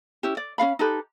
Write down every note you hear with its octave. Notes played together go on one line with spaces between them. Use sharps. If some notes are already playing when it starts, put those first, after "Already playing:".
C#4 E4 G4
D5
C#4 F4 F5 B5
D#4 G4 A4 B4